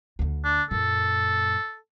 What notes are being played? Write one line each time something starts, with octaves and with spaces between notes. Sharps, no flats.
D2 D3
D4
F#2 A#2 A4